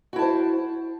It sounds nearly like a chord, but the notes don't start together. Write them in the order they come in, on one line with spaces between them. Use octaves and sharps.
F#4 E4 A5 C5